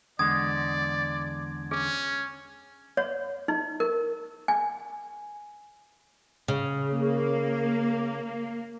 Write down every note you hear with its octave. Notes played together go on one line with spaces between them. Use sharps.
E2 D3 G#3 D5 D#6 G#6
C#4 G#4
C#5
D#4
A#4
G#5
C#3
A#3